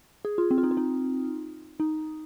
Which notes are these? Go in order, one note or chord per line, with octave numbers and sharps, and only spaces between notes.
G#4
F4
C4
F4
D#4
F4
D#4
D#4